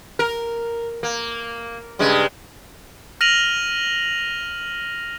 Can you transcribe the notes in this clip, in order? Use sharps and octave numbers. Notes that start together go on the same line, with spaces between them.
A#4
A#3
G2 C#3 G#3
F6 A#6 D#7 F7 F#7